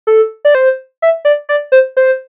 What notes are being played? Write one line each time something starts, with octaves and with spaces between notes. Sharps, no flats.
A4
D5
C5
E5
D5
D5
C5
C5